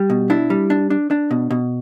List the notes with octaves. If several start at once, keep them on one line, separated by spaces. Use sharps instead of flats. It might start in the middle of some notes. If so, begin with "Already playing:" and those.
Already playing: G3
B2
D4 E4
G3
D4
D4
D4
B2
B2